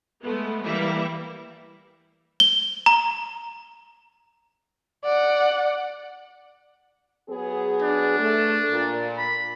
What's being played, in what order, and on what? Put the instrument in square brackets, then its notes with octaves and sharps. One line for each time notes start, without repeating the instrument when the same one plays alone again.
[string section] G#3 A3 B3
E3 G3 A#3 E4
[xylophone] G7
A#5
[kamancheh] D5 F#5
[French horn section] F#3 B3 G#4
[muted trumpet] D4
[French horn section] A3
A#2
[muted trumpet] B5